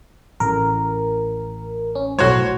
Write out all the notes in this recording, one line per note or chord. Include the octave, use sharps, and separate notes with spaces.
A1 A#4
C#4
B1 A2 F#4 C5 C#5